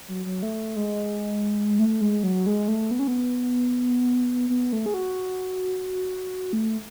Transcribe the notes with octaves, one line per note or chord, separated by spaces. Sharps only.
F#3
F#3
A3
G#3
A3
G#3
F#3
G#3
A3
B3
C#4
B3
B3
A3
G#4
F#4
A3